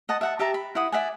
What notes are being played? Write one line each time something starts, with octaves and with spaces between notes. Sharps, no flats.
D#5 F#5 A5
E5 F#5 A5
G4 E5 A5 A#5
B5
E4 F#5 D#6
D5 E5 F#5 G#5